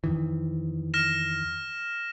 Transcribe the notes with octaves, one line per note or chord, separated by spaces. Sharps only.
F2 D#3 E3
F6 A#6 E7